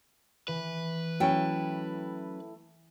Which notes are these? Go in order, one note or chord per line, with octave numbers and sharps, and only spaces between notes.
E3 B4
F#3 A3 C#4 E4 G5